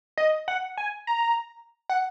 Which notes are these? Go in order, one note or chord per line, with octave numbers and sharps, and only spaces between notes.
D#5
F#5
G#5
A#5
F#5